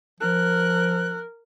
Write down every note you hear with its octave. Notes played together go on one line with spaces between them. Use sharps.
F3 A#4 F#6